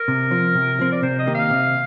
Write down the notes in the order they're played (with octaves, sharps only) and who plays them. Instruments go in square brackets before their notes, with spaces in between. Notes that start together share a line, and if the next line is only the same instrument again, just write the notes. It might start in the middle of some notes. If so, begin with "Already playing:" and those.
Already playing: [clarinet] A#4
[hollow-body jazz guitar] C3
F3 C4
C3
F3 C4
[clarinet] D5
[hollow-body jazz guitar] C3 [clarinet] C5
[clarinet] D#5
[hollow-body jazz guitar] D#3 A#3 D#4 G4
[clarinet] F5
[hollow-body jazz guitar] C3